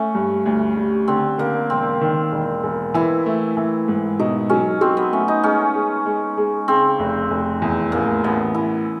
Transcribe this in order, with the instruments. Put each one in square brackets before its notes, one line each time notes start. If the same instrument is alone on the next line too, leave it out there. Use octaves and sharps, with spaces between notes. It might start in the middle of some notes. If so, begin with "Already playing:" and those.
Already playing: [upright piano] A3 [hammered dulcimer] C#4
[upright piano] G2
D2
G3
[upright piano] D3 [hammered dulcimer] C4
[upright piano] D3 [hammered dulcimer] A#3
[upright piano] E1 [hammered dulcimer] C4
[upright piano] D#3
E1
E1
[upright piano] E3 [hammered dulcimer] E4
[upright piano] A3
E3
G#2
[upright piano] B2 [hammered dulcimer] D#4
[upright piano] F#3 [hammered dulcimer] C#4
[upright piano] F#3 [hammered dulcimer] C4
[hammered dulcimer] B3
[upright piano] A3 [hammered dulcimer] C#4
[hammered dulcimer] D#4
[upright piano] G#3 [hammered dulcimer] C#4
[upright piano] G#3
G#3
G#3
[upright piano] C#3 [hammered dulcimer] C4
[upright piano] F1
F1
E2
[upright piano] A1 [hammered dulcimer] A#3
[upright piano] A1 [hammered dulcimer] B3
[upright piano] E3 [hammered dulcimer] E4